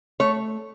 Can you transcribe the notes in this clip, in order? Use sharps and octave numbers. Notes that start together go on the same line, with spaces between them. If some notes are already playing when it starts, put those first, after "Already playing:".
A3 C#5